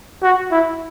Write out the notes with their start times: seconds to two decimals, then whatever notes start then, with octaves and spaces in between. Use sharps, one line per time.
0.23 F#4
0.52 E4